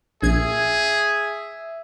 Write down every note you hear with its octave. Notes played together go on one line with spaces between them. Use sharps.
A#1 G#4 E5 G#6